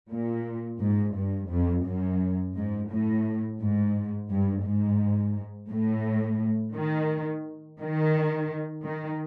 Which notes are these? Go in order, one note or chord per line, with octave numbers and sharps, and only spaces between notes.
A#2
G#2
G2
F2
F#2
G#2
A2
G#2
G2
G#2
A2
D#3
D#3
D#3